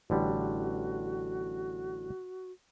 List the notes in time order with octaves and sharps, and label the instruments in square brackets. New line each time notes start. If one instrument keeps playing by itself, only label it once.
[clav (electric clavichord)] A1 D3 G3 [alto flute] F#4